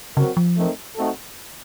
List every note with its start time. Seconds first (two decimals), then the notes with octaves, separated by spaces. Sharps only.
0.17 C#3 F#3 C4 F#4 A#4
0.37 F3
0.57 A3 C4 D#4 A#4
0.96 A3 C4 D#4 F#4 A4